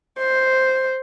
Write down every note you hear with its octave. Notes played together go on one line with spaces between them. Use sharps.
C5